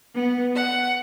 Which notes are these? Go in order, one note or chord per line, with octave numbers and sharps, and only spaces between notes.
B3
F#5